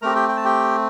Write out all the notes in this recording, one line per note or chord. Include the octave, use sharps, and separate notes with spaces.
A3 C4 G4 A#4 A#5
G4 G5
G5
A5
G4 G5